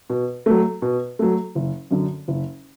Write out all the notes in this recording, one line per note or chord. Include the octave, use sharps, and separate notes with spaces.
B2
F#3 A3
B2
F#3 A3
F#1
F#2 D3
F#1